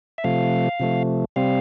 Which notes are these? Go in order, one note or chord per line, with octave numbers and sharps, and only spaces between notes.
E5
C3 F3 A3 F5
C3 F3 A3
C3 G3 C4 F5